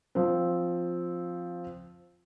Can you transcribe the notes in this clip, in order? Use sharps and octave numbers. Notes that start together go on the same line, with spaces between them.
F3 C4